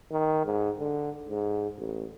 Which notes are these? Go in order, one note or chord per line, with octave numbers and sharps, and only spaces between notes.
D#3
G#2
D3
G#2
A1